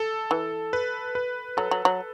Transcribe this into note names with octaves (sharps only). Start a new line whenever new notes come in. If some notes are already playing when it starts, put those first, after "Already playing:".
Already playing: A4
E3
B4
B4
F#3 A4
F#3
F#3